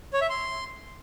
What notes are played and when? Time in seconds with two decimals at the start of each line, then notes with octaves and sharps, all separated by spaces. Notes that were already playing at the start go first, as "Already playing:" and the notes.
0.13 C#5
0.21 E5
0.30 C6